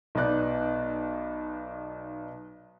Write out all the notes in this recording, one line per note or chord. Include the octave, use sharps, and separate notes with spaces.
B1 B3 D#4 D5 F#6